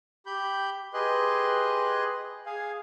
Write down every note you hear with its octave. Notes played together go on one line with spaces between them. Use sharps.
G4 B5 G6
G4 G#4 B4 D#5 C6 F#6
G#4 F5 G#5